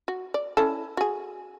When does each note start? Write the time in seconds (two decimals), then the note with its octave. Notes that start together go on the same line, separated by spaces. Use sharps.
0.08 F#4
0.34 D5
0.57 C#4 E4 A4
0.97 F#4 G#4